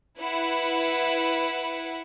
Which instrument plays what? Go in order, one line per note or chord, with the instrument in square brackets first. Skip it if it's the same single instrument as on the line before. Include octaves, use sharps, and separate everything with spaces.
[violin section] E4 B4 F#5